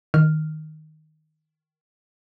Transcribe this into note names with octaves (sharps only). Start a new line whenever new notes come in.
D#3 F6